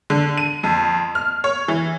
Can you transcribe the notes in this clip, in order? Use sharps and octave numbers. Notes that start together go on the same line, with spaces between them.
D3
D#7
F2
F6
C#5
E3